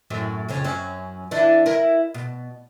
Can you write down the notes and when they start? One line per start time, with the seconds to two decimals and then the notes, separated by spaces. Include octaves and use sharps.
0.10 F#2 A2 F#3
0.49 F2 C#3 C#4
0.64 F#2 F#3 C#4
1.31 E3 D4 E4
1.66 E4 A#4
2.14 B2